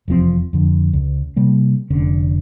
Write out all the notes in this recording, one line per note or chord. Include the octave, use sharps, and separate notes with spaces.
F1 E2 F3 C4
F2 D3
C#2
C3 G3 A#3
F1 D3 C#4